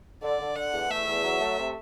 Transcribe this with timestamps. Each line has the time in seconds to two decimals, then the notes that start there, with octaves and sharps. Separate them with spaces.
0.22 D3 D5
0.40 D3
0.56 D3 F#5
0.73 E2
0.89 A3 E5
1.07 E2
1.23 F#3
1.41 A3
1.58 C3